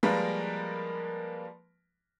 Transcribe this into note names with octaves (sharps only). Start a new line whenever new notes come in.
F3 G3 G#3 A#3 A#4 B4